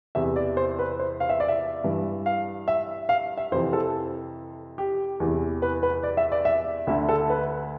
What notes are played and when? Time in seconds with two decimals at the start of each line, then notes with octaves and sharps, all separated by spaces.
0.15 E2 C3 E3 E5
0.36 D5
0.57 C5
0.79 B4
0.99 C5
1.20 F5
1.29 E5
1.40 D5
1.48 E5
1.84 G2 E3
2.26 F5
2.68 E5
3.09 F5
3.37 E5
3.52 F2 C3 E3 C5
3.73 A4
4.78 G4
5.20 E2 C3 E3
5.62 B4
5.83 B4
6.03 D5
6.17 E5
6.32 D5
6.45 E5
6.87 D2 D3 E5
7.09 A4
7.30 B4